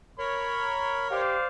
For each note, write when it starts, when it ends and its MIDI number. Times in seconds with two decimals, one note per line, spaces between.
0.19 1.22 70
0.19 1.22 73
0.19 1.07 83
1.10 1.37 67
1.10 1.46 72
1.10 1.46 74
1.10 1.46 77